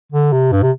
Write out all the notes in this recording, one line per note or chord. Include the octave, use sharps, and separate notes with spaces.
D3
C3
G2
C3